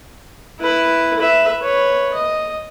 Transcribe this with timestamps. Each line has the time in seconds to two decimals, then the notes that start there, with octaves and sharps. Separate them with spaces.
0.60 E4 B4
1.19 B4 E5
1.61 B4 C#5
2.14 D#5